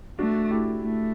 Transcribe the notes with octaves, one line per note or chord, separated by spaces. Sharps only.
A3 D4 F#4
E4 G4
A3